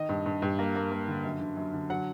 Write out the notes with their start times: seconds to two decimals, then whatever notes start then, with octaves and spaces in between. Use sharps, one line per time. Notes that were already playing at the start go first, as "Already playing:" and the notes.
Already playing: D#3 D#5
0.09 G2
0.26 G2
0.42 G2
0.59 A#3
0.76 A#3
0.92 A#3
1.08 D3
1.24 F#2
1.40 D3
1.57 F#2
1.74 D3
1.90 F#3 F#5